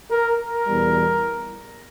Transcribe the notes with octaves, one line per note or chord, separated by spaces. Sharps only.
A#4
A#4
E2 B2 G3